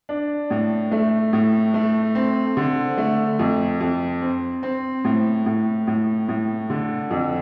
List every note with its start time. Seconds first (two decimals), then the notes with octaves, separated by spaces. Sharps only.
0.09 D4
0.50 A2
0.92 A3
1.33 A2
1.74 A3
2.15 C4
2.57 D3
2.98 A3
3.39 F2
3.81 F2
4.22 C4
4.63 C4
5.05 A2
5.46 A2
5.87 A2
6.29 A2
6.70 D3
7.11 F2